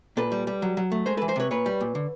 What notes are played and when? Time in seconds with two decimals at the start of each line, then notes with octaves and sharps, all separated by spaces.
0.17 A#2 A4 B4
0.32 G3
0.47 G3
0.62 F#3
0.77 F#3
0.92 A3
1.06 G#3 A#4 C5
1.17 A4 B4
1.22 E3
1.28 A#4 C5
1.36 C3 B4 C#5
1.51 A#2 B4 C#5
1.66 G3
1.80 A#2
1.95 D3